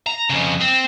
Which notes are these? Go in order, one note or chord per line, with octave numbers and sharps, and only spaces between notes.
A#5
F2 C#3
C4